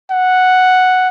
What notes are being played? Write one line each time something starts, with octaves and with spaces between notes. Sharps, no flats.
F#5